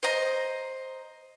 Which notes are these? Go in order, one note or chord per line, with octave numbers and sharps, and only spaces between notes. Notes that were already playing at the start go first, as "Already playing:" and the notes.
C5 D#5 A#5